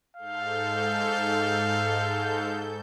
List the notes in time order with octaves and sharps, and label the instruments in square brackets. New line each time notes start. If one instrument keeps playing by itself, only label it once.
[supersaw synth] G#2 A4 G6 [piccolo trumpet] F5